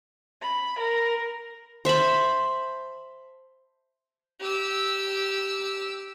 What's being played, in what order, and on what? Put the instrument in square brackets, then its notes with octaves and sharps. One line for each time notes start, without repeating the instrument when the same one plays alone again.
[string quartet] B5
A#4
[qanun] C5 E5 A5 B5
[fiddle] G4 E6